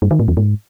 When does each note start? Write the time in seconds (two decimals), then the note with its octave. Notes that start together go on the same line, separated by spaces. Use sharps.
0.02 G2
0.11 D#3
0.20 A2
0.28 E2
0.37 G#2